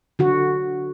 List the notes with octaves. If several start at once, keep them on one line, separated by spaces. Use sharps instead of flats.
D3 F#4